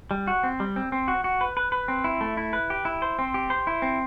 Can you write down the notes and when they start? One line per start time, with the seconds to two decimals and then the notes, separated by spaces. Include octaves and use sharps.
0.11 G3
0.27 F#4
0.43 C4
0.60 G3
0.76 C4
0.92 C4
1.08 F#4
1.24 F#4
1.41 B4
1.57 B4
1.72 B4
1.88 C4
2.04 E4
2.21 A3
2.37 E4
2.53 B4
2.70 G4
2.85 E4
3.02 C5
3.19 C4
3.34 G4
3.50 C5
3.67 E4
3.82 C4